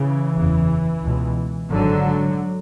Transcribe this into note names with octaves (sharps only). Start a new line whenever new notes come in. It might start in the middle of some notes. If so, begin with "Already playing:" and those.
Already playing: C#3 E3
F#1 E2 C#3
C#2 B2
G#1 G#2 D3 F#3